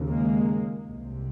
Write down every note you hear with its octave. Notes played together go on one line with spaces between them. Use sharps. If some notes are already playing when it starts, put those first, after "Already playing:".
Already playing: D#2 C#3
G#3 A#3
C2 C3